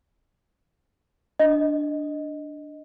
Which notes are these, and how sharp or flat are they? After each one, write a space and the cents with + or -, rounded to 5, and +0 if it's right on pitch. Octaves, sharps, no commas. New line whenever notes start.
D4 +0 D#5 +0